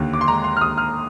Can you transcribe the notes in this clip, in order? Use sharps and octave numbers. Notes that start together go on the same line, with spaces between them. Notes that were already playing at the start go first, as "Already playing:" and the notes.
Already playing: D#2 D3
D6
C6
G#3 A#5
C6
F6
D#2 D#6
F6